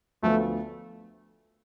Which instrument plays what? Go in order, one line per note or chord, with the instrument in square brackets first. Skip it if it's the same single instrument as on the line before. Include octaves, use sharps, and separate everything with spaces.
[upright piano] D2 D3 F3 B3 [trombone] A3